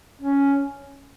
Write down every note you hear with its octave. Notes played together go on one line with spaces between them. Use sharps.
C#4